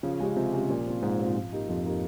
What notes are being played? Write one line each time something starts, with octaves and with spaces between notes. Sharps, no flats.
C#3 F3
G#3 C#4 G4
C3 F3
G#3 C#4 G4
A#2 F3
C4 F4
G#2 F3
C4 F4
F3
A#3 D#4 G4
F2 F3
A#3 D#4 G4